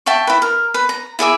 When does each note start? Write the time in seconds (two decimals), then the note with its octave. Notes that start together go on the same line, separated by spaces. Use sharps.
0.06 E5 G5 A5 C#6
0.27 E4 B4
0.42 A#4
0.74 B4
0.89 A#5
1.19 E4 G#4 E5 D6